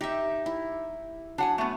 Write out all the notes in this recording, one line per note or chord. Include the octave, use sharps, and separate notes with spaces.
D#4 G4 E5
E4
F#3 D4 F#5 G#5
A3 B3